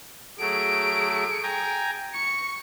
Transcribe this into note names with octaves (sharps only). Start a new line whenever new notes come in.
F#3 A3 G#4 D7
G5 G#5 A#5
C#6 C#7